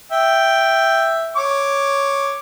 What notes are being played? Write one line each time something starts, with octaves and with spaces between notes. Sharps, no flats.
E5 G5
C#5 D6